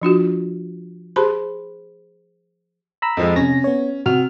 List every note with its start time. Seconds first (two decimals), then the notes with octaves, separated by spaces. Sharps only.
0.02 F3 D4 F4 F#4
1.16 G4 G#4 C5 A5 B5 C6
3.02 A#5 B5 E6
3.17 F2 F3 G#3
3.36 C3 C#4 A#6
3.64 B3 C#5
4.06 C3 F#4 F6